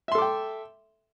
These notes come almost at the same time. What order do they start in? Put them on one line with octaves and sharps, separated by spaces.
E5 C6 A4 D6 G5